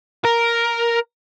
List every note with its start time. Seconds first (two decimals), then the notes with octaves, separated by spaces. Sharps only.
0.25 A#4